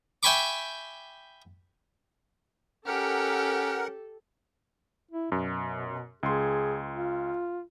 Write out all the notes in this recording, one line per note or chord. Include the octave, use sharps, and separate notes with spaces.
E5 G5 G#5 B5 C#6 D6
C#4 G4 A4 A#4 F#5
E4
F#2 B2
C#2 G#4 C6
F4